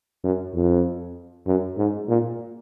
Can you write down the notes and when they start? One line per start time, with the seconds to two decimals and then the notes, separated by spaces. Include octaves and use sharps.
0.24 F#2
0.55 F2
1.47 F#2
1.78 G#2
2.08 A#2